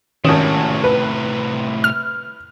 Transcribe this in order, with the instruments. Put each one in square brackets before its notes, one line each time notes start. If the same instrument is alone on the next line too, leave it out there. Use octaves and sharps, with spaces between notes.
[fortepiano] G#1 C#4 [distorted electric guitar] A2 C3 [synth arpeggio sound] D#3
[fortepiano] B4
[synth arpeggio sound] F6